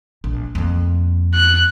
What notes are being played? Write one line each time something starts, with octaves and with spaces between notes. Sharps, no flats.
A#1
F2 A#3
F#6